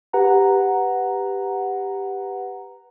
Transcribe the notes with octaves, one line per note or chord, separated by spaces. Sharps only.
G4 B4 F#5 A#5